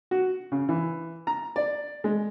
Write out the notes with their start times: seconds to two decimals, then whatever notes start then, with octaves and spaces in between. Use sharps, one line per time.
0.11 F#4
0.52 C#3
0.69 E3
1.27 A#5
1.56 D5
2.04 G#3